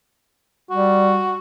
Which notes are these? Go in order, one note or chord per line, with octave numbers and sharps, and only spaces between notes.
G3 F#4